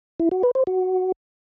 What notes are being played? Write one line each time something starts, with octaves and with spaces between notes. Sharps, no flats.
E4
F#4
B4
C5
F#4